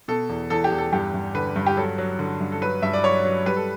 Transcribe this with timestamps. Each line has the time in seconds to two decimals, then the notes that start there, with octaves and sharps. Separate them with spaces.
0.08 B2 A4
0.29 E2
0.50 E2 A4
0.64 G4
0.71 E2
0.78 A4
0.93 G2 G4
1.14 G2
1.35 D3 B4
1.56 G2
1.66 G4
1.77 F#3 A4
1.98 F#3
2.19 D3
2.41 G2
2.52 A4
2.61 F#3 B4
2.82 G2 E5
2.93 D5
3.04 F#3 C#5
3.25 F#3
3.46 G3 B4
3.57 A4